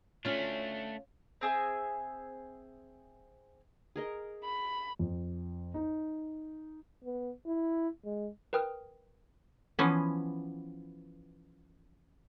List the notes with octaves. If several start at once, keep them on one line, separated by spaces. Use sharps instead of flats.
A3 C#4 D4 F4
C4 G#4 E5 G#5
G#4 A#4 D#5
B5
F2
D#4
B3
E4
G#3
A#4 B4 G5 D#6 F6
E3 F3 B3 C#4